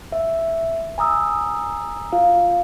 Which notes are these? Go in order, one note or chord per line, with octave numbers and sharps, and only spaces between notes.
E5
G#5 A#5 D#6 E6
F4 F5